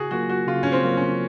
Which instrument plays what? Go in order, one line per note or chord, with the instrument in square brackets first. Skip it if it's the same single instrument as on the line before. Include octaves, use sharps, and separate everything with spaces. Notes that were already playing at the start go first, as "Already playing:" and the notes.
Already playing: [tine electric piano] C#3 [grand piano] F#4 G#4
[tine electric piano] F#3 A#3 F4 [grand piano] F#4
[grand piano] F#4
[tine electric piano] C#3 [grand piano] F4
[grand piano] C#4
C4
[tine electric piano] F#3 A#3 F4
[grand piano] C#4